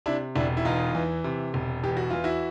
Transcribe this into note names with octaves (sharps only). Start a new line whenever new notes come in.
C3 D4 E4
E1 D4 E4
E4
E2 D#4 F4
E3
C3
E1
E2 G4
F#4
E3 F4
E4 F#4